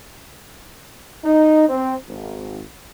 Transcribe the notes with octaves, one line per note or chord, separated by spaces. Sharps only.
D#4
C4
G#1